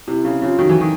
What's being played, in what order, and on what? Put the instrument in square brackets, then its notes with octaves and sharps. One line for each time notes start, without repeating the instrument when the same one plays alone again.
[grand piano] C3 [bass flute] E4
[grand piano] C#3
C#3
[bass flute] F4
[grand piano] D#3 [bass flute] F#4
[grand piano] E3
D#3